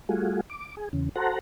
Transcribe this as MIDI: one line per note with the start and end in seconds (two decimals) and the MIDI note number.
0.09 0.41 55
0.09 0.41 57
0.09 0.41 65
0.09 0.41 66
0.09 0.41 68
0.50 0.75 86
0.77 0.89 68
0.93 1.09 40
0.93 1.09 49
1.16 1.39 66
1.16 1.39 69
1.16 1.39 72
1.16 1.39 78
1.16 1.39 82